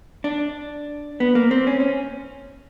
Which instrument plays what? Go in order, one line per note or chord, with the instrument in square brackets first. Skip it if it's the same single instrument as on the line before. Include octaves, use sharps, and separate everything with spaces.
[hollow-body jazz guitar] D4
B3
A#3
C4
C#4
C#4